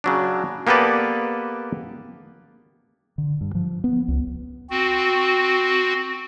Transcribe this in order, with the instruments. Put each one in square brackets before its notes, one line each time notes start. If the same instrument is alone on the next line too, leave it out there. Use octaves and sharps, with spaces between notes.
[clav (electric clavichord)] C#3 F#3 D4
A#3 B3 G4 A4 B4 D5
[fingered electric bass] D3
G2
F3
B3
C#2
[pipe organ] C4 F#4